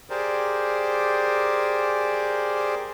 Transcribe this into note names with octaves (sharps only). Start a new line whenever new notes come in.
G4 G#4 A#4 C5 D5